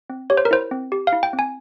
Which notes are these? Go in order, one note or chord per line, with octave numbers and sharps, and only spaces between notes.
C4
G4 C#5
C5
A#4
E4 C5
C4
G4
F5
E4
G5
C4
G#5